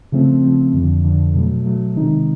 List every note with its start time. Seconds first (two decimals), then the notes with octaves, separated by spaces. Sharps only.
0.12 C#3 F3 A3 C4
0.44 C#3 F3 A3 C4
0.73 F2 D3 F3
1.04 F2 D3 F3
1.34 B2 F#3 A3
1.65 B2 F#3 A3
1.96 C3 D#3 G#3 C4 D#4